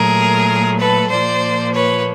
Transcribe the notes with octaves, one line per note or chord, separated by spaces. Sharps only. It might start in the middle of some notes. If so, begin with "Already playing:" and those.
Already playing: A#2 F#3 A3 G#4 A#4
A4 B4
A#2 F3 A#3 C5 D5
B4 C#5